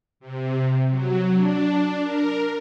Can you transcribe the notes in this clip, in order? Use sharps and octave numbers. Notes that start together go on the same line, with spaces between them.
C3
F#3
D4
A#4